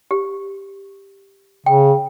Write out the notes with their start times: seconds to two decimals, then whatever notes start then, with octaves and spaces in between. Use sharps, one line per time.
0.11 G4
1.66 C#3 G5